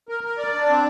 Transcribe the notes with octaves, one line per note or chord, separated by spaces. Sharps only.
A#4
A#4
D5
D4
C4